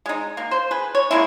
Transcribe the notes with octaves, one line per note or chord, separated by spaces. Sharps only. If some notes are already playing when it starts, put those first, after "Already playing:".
G#3 D#4
A#3
C5
G#4 B4
C#5
G#3 A#3 C#4 E4